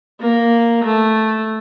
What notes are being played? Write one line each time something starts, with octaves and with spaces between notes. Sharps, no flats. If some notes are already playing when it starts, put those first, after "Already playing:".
A#3
A3